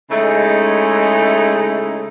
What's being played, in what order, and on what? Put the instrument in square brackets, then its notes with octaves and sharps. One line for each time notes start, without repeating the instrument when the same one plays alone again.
[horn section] C#3 G#3 A3 D#4 E4